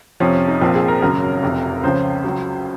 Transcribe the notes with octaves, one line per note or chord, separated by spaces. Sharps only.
F2 C3 F3 C#4
C#4
D#4
A#1 A#2 F3 C4
G#4
A#4
G#1 F#2 C#3 A#4
F1 F2 C3
C#2 C#3 F3 C5
C#2 C#3 F#3